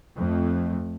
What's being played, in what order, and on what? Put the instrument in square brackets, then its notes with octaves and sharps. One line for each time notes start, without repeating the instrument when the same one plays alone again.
[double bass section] F2 A3